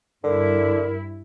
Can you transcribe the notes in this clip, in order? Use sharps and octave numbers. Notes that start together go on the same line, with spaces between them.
G2 D3 E4 A#4